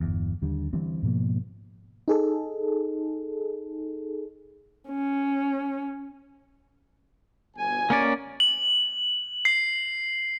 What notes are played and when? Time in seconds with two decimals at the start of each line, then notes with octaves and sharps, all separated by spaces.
0.01 G1 E2
0.42 D#2 D3 G3
0.73 D3 E3 G3 C4
1.02 G#2 B2 F3 A#3
2.08 D#4 G#4 A4
4.89 C#4
7.57 G1 B2 G#5
7.90 A#3 C#4 D5
8.40 F#7
9.45 C7